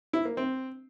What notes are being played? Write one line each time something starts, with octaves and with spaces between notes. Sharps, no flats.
E4
A#3
C4